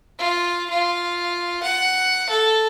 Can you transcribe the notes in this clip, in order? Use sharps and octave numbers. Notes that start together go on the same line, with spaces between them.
F4
F4
F#5
A4